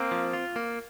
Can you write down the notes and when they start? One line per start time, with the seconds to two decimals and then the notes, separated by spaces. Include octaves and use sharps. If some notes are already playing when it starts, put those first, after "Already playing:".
Already playing: A#3 C4
0.11 F3
0.33 F4
0.56 A#3